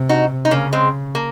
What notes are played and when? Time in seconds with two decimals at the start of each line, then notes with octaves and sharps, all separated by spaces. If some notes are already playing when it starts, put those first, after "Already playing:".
Already playing: C3
0.09 D#4 F#4
0.45 D#4
0.51 C#3 A#3 C#4
0.73 G#3 C4
1.15 A#3